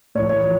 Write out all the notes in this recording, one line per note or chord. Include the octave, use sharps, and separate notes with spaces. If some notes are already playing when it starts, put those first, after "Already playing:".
A2 E3 C#5
C#5
F3